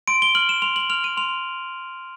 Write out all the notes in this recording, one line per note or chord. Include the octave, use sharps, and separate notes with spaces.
C6 D7
G7
F6 F#7
E7
C6 F7
F#7
F6 F7
D#7
C6 F7